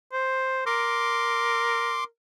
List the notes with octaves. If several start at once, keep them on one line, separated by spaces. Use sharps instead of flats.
C5
A#4 C6 D6